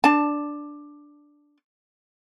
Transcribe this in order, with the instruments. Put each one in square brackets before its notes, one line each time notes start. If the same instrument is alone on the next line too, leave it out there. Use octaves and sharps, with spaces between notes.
[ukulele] D4 A5